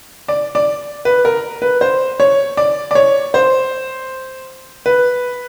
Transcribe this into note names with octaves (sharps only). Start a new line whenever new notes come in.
D5
D5
B4
A#4
B4
C5
C#5
D5
D5
C#5
C5
B4